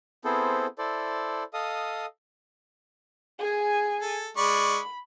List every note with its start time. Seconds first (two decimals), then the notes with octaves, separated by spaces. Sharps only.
0.24 B3 C4 E4 G#4 A4 C5
0.78 E4 A4 C5 D5
1.53 A4 D#5 F5 D#6
3.39 G#4 G#5
4.02 A4
4.37 G#3 D5 B5 C#6